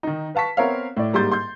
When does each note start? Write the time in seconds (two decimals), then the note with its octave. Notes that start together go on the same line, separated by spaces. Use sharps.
0.03 D#3 D#4
0.35 B4 F5 A5 C#6 B6
0.57 B3 C4 A#4 C#5 E5 F5
0.97 A2 D5
1.13 G#2 G3 A#3 C6 G6 A6
1.31 C6 G6